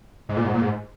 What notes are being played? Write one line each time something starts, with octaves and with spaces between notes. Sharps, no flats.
G#2
A#2
G#2
A#2
G#2